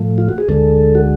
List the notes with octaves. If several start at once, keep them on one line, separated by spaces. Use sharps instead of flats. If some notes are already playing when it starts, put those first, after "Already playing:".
Already playing: A2 F3 A3
F4
F#4
G#4
D2 D3 G#3 A4
F#4